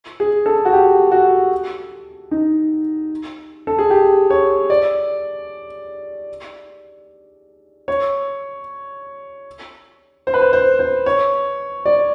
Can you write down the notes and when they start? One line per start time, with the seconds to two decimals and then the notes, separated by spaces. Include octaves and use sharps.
0.20 G#4
0.46 A4
0.65 F#4
0.73 G4
1.12 F#4
2.31 D#4
3.67 A4
3.79 G#4
3.90 G4
4.30 C#5
4.70 D5
7.88 C#5
10.27 C5
10.34 B4
10.41 C5
10.53 C5
10.79 C5
11.06 C#5
11.85 D5